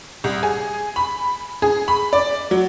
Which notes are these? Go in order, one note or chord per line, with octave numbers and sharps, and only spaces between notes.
C2
G#4
B5
G#4
B5
D5
F#3